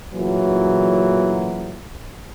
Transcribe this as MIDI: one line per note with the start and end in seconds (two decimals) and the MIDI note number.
0.14 1.82 33
0.14 1.82 46
0.14 1.82 49
0.14 1.82 52
0.14 1.82 54